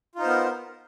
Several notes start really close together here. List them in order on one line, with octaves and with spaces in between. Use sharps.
F4 D#4 C5 B3 A#4